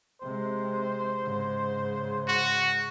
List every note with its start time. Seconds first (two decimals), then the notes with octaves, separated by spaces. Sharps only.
0.21 C3 G#3 C5
1.21 G#2 C#3
2.28 F#4